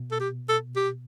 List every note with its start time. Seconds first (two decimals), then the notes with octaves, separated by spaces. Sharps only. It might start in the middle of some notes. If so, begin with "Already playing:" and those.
Already playing: B2
0.12 A4
0.20 G4
0.49 A4
0.76 G4